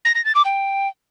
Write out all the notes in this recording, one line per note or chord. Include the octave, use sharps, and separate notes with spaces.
A#6
A#6
A6
D6
G5